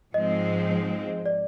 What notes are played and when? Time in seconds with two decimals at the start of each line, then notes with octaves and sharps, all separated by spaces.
0.14 G#2 F3 G#3 C4 D#5
1.26 D5